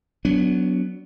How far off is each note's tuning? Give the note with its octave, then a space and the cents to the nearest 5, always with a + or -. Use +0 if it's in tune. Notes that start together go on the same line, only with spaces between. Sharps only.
F#3 +0 B3 +0 D4 -25